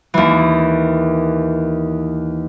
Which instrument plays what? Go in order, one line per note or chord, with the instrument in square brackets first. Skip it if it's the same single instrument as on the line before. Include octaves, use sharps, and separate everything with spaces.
[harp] D#2 E3